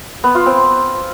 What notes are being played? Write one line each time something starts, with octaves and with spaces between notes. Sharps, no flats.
B3
F4
C4